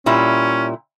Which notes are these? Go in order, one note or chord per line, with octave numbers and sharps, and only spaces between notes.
A#2 G3 C#4 E4